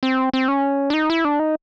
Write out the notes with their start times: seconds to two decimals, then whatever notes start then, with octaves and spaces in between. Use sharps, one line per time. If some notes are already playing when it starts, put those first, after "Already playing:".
0.03 C4
0.34 C4
0.48 C#4
0.90 D4
0.94 D#4
1.10 E4
1.25 D4
1.39 D#4